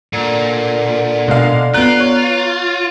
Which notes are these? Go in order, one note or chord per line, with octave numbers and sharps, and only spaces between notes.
A#2 D3
B2 G#3 D4 F5
B3 F4 A#5 F#6 D7
C#5